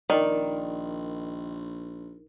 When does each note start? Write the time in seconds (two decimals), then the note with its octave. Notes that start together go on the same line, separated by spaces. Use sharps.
0.10 A#1 D#3 D#4 A#4 D5